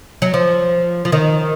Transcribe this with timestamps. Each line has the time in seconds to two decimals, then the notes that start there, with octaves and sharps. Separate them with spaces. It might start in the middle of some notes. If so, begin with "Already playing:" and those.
0.22 F#3
0.34 F3
1.05 F3
1.12 D#3